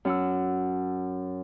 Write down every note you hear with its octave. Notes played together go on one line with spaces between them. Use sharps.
F#2 F#5 E6